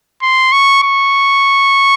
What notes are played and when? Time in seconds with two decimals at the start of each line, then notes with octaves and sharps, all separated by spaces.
0.22 C6
0.52 C#6
0.83 C#6